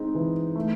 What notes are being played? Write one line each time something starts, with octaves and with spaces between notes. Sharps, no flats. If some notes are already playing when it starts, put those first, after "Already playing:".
Already playing: G#3 C4 D#4
E3
A3